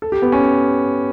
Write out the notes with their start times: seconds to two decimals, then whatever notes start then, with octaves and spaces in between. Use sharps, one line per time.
0.02 A4
0.12 G4
0.22 B3
0.32 C#4